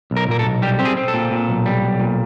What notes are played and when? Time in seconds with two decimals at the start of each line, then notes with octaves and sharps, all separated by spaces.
0.11 B1
0.17 A#4
0.28 A#2 A#4
0.39 A4
0.45 B1
0.62 G3 G4
0.79 C4 G4
0.85 G#4
0.97 C4
1.08 A4
1.14 A#2
1.31 A#2
1.48 B1
1.66 G3
1.82 B1
2.00 A#2